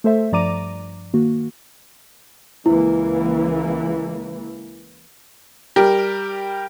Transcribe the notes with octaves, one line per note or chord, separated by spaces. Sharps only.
A3 A4 C5 E5
G2 F3 D5 A#5 D6 D#7
D#3 A#3 F#4
C#2 E3 A#3 E4
G3 G4 A#4